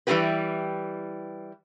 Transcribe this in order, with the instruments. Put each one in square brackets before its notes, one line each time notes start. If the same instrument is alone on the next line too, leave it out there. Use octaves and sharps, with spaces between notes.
[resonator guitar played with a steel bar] E3 G3 C4 F4 G4 B4